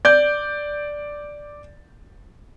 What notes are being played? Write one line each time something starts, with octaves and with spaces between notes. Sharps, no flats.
D5 G6